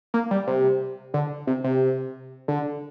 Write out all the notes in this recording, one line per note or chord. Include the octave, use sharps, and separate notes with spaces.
A#3
G3
C3
D3
C3
C3
D3